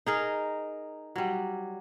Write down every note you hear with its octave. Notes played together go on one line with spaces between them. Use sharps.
D#4 G#4 A#4
F#3 G3